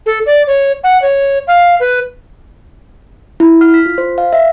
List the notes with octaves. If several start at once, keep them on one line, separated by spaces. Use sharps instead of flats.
A4
D5
C#5
F#5
C#5
F5
B4
E4
F6
B6
F4
C5
F5
E5